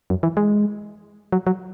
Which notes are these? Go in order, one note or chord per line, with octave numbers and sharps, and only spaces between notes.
F#2
E3
G#3
F#3
F#3